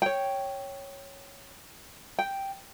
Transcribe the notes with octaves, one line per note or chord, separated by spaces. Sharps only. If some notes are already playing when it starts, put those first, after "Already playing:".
C#5 G5
G5